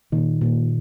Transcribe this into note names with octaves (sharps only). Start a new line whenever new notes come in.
A#2 D#3
A#2